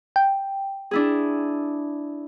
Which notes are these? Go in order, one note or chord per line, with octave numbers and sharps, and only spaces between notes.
G5
D4 E4 G#4